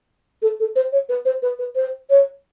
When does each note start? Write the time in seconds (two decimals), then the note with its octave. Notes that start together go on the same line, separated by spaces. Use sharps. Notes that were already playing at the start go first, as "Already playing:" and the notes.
0.42 A4
0.60 A4
0.76 C5
0.92 C#5
1.09 B4
1.25 C5
1.42 B4
1.59 B4
1.76 C5
2.10 C#5